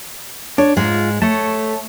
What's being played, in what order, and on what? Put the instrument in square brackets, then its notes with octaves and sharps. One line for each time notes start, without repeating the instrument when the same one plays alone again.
[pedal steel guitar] D4 [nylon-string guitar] C#5
[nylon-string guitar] G#2 G#3 [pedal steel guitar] F4
[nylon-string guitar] A3 [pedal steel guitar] C#5 A5